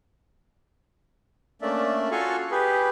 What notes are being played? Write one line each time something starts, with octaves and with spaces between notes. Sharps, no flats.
A3 A#3 C#4 D4 D5 E5
F4 F#4 A4 F5 G#5 C#6
G4 G#4 B4